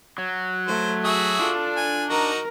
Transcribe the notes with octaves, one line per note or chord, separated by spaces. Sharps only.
F#3
A3 C5
F#4 G#4 E5
D4 F4 A4
G#5
D#4 F#4 A#4